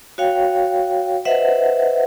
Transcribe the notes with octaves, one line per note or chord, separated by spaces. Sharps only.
F#4 C#5 F5 G5
B4 C5 D#5 E5 F#5